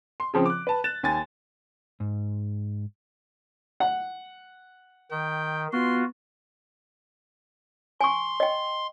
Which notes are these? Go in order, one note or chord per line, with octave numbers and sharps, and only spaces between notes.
C6
C#3 F3 C4
D6 F#6
B4 A5
F#6 A6 E7
D#2 G#5 A6
G#2
F#5
D#3 G5
B3 F4 F#4 C6
G#5 C6 C#6
D#5 G5